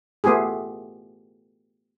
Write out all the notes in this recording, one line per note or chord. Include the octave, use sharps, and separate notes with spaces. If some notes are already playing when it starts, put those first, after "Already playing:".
A3 B3 F4 G4 G#4